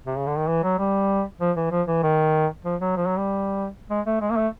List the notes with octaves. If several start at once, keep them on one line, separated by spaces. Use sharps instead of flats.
C3
C#3
D3
D#3
E3
F#3
G3
F3
E3
F3
E3
D#3
F3
F#3
F3
F#3
G3
G#3
A3
G#3
A#3
A3